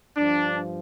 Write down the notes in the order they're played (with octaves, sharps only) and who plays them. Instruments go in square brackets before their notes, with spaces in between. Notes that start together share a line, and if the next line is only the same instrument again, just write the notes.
[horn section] G2 F3 D4